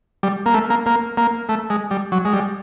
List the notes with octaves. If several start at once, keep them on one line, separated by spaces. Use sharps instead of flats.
G3
A#3
A3
A#3
A#3
A#3
A3
G#3
G3
F#3
G#3
G3